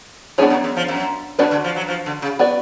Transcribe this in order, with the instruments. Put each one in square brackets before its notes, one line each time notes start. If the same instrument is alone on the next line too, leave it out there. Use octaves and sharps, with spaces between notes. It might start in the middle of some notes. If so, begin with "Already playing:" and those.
[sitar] A2 [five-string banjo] B3 D4 G#4 C#5
[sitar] F#2
F#2
F3
F#2
[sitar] B2 [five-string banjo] D4 F#4 B4 D5
[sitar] D3
F3
F#3
F3
D3
C#3
[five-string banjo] B3 F#4 B4 D5